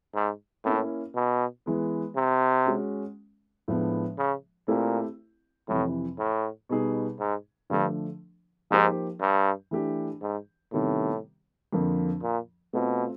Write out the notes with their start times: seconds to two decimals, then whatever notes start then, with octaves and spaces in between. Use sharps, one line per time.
0.15 G#2
0.65 A2 A#3 C#4 E4
1.15 B2
1.66 E3 G#3 B3
2.16 C3
2.67 G#3 C#4 F#4
3.68 A2 F3 G#3 B3 D4
4.18 C#3
4.68 A#2 A3 C4 E4 G4
5.68 F2 A2 C3 E3
6.19 A2
6.69 B2 G3 B3 D#4 G#4
7.19 G#2
7.70 G2 D3 F3 A3 D4
8.70 G#2 F3 A#3 D#4 G4 C5
9.21 G2
9.71 E3 A3 D4 G4
10.22 G#2
10.72 A2 C3 D#3 G3 B3
11.73 F2 D3 F3 A#3
12.23 A#2
12.73 B2 A3 C4 F4